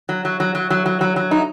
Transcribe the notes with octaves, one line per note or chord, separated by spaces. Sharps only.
F#3
F#3
F#3
F#3
F#3
F#3
F#3
F#3
D#4